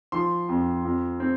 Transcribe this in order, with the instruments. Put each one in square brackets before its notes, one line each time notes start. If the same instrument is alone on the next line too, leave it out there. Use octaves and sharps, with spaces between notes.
[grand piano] F3 C6
F2
F2
C4